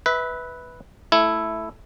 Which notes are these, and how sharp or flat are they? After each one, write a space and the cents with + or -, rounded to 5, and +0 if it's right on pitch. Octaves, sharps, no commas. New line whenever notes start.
B4 +0 E5 -25
A3 -5 E4 +5